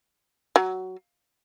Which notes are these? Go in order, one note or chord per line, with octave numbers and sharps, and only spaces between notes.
F#3